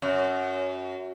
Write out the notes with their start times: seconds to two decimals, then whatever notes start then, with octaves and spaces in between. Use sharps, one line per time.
0.02 F#2